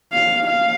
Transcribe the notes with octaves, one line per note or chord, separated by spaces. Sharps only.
F5
F5